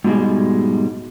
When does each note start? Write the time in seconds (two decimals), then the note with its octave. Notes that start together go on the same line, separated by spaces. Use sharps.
0.04 G#2 B2 G3 G#3